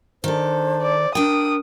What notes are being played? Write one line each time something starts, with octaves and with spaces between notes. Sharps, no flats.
D#3 D4 A4 C5
D5
D4 A#4 G5 D#6